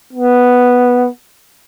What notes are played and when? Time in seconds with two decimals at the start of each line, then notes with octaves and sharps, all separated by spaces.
0.13 B3